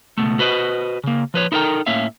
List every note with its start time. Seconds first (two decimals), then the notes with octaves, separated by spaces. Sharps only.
0.18 C#2 G#2 B2 A3
0.39 F#4 B4 C5 D#5
1.04 C#3 A#3
1.34 F3 B4 C#5
1.52 D#4 E4 A4 A#4 G5 A#5
1.86 A2 A#3 C#4 E5 F5